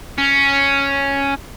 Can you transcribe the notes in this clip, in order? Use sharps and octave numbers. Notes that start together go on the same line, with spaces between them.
C#4